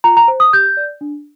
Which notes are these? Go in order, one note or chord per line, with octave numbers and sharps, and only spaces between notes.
F4 A#5
A#5
C5
D#6
G4 G6
D5
D4